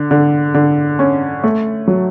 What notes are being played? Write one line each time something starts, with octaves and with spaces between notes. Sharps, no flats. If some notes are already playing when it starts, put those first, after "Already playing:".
Already playing: D3
D3
D3
C#4
A3
F#3